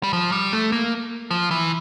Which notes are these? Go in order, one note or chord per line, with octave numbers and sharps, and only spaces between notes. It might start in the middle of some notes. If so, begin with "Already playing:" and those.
G3
F3
G3
A3
A#3
F3
E3